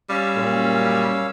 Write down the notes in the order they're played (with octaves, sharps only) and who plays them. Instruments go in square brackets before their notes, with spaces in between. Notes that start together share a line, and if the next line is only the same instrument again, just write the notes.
[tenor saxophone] G3 [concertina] C#4 F5 E6
[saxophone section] F#2 A#2